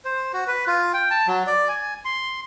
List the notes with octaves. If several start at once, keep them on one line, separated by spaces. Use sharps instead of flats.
C5
F#4
B4
F4
G5
A5
F#3
D5
G#5
C6